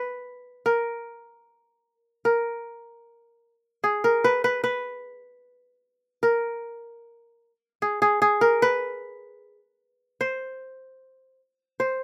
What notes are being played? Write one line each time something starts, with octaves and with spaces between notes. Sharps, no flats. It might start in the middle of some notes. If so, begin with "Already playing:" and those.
Already playing: B4
A#4
A#4
G#4
A#4
B4
B4
B4
A#4
G#4
G#4
G#4
A#4
B4
C5
C5